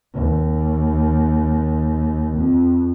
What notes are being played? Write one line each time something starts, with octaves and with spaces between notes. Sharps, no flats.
D#2
F2